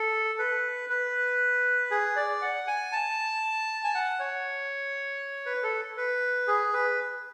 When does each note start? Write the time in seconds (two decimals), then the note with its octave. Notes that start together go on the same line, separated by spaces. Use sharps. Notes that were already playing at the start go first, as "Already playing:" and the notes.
Already playing: A4
0.39 B4
0.90 B4
1.91 G#4
2.16 D5
2.42 F#5
2.67 G#5
2.92 A5
3.84 G#5
3.94 F#5
4.20 C#5
5.46 B4
5.63 A4
5.97 B4
6.48 G#4
6.73 B4